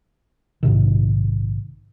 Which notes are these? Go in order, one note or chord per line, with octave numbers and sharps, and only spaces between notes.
A#1 G#2 C3 D#3